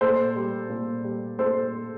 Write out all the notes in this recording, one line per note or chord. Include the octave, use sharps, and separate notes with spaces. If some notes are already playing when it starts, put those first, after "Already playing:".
A#2 A4 C5
G3
A#2
G3
A#2 A4 C5